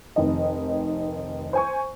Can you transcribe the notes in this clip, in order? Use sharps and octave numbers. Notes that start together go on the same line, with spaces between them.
F1 D#3 D#5
C5 G#5 C#6